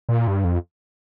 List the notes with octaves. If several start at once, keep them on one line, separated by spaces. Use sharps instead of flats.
A#2
G2
F2